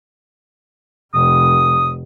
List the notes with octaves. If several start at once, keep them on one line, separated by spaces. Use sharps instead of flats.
F1 D#6